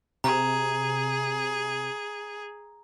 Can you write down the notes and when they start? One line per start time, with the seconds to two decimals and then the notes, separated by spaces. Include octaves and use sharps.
0.24 C3 G#4 A#5